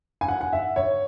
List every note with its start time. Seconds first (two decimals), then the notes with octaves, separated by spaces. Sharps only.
0.21 G#5
0.28 F#5
0.41 F#5
0.53 E5
0.76 C#5